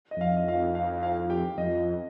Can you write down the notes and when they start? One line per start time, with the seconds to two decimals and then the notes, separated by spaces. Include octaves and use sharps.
0.11 D#5
0.17 F2 F5
0.37 D#5
0.48 F5
0.75 F5
1.03 F5
1.30 G4 G5
1.57 F2 D#5